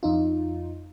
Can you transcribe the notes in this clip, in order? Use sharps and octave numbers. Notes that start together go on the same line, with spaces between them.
F2 D#4 F4